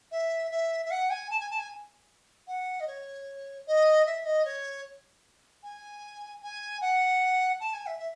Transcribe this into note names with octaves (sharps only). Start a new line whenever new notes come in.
E5
E5
E5
F#5
G#5
A5
G#5
A5
G#5
F#5
D#5
C#5
D#5
E5
D#5
C#5
G#5
G#5
F#5
A5
G#5
E5
E5